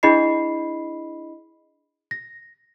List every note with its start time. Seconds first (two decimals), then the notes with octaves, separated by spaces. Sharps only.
0.03 D4 E4 G#4 D#5 B5 C7
2.11 A#6